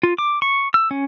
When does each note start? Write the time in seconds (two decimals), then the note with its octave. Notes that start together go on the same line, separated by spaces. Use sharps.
0.03 F4
0.18 D6
0.42 C#6
0.74 E6
0.91 C#4